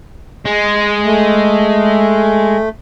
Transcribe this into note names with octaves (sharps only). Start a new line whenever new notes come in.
G#3
A3